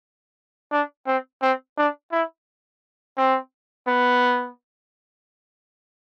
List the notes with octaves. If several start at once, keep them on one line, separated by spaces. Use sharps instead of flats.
D4
C4
C4
D4
E4
C4
B3